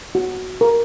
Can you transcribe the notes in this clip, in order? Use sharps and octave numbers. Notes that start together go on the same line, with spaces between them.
F#4
A#4